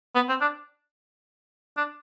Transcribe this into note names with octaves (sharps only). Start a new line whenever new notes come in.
B3
C4
D4
D4